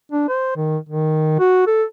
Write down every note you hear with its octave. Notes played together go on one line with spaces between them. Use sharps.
D4
C5
D#3
D#3
F#4
A4